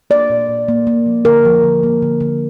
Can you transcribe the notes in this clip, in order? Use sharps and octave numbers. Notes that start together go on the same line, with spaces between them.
A#3 D5
A#2
A#2
A#3
A#3
F3
D3 A#4
F3
D3
A#3
D3
D3